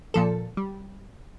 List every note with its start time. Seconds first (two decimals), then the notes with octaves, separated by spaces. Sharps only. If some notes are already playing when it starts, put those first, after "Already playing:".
0.14 A#2 F3 A4
0.57 G3